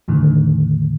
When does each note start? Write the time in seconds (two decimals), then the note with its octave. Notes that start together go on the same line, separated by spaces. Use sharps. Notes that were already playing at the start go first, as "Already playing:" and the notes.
0.08 E2 A2 D3 D#3